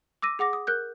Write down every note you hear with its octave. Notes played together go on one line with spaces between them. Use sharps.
D6 E6 A#6 D#7
G#4 F#5 D6 A#6
D#6
A#4 F#6 G6